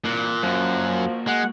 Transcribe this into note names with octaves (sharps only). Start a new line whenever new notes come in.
G2 A#2 E3 F#6
F#2 F3 A#3 F#4
G#3 F#5